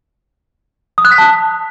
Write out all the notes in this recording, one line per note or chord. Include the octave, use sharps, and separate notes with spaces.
D#6
F#6
B6
A5